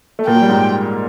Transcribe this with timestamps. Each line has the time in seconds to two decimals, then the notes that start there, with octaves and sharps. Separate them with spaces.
0.19 A3
0.27 A#2 A#3 G5
0.34 F#3
0.42 G3
0.49 G#2 G#3